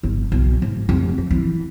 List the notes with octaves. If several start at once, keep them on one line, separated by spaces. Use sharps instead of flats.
G1
B1
G#2
F1
F2
E3